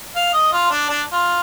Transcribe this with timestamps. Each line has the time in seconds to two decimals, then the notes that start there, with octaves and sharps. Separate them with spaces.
0.16 F5
0.33 D#5
0.52 F4
0.71 D4
0.89 D4
1.12 F4